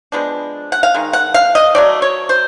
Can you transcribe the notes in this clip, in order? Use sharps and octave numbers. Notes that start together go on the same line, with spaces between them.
F3 G#3 B3 D4
F#5
F5
D#3 G#3
F#5
F5
D#5
F#3 A3 C4 D5
C#5
C5